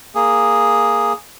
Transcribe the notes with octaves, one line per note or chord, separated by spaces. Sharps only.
A#3 G#4